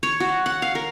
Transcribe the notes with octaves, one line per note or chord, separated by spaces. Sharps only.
C#5
F#4
F#5
F5
A#4